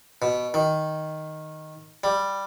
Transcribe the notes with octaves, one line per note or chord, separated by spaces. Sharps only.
B2
D#3
G3